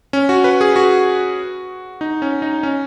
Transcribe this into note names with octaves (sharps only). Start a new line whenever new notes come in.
C#4
F#4
B4
G#4
F#4
D#4
C#4
D#4
C#4